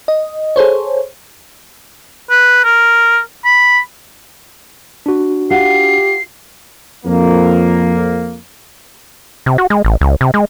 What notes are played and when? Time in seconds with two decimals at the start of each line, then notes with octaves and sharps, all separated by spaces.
0.08 D#5
0.56 G#4 A4 C5 C#5
2.30 B4
2.64 A#4
3.45 B5
5.06 D4 F#4
5.50 F4 G4 F#5 C7
7.06 F2 A#3
9.46 C3
9.58 F#4
9.70 G#3
9.85 A1
10.01 C#2
10.21 C3
10.34 G#3